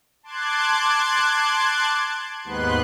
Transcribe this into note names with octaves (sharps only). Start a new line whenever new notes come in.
A5 C6 D6 F#6 G#6
D#2 G#2 B3 B4 C6 F#6